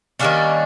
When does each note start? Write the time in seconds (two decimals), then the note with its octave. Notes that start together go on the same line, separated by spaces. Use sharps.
0.19 D#3 G3 A#3 C#4 D4